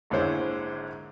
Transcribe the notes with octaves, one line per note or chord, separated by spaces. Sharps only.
A#1 G#2 D3 E4 C5 C#5